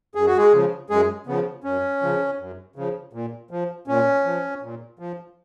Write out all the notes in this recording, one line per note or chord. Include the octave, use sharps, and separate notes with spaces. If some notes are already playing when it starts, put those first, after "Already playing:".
F#2 G#4
F#4
G#3 G#4
C#3 F3
F#2 G#3 G#4
C#3 F3 B3
F#2 C#4
C#3 F3
F#2
C#3 F3
A#2
F3
A#2 C#4
F3
A#2
F3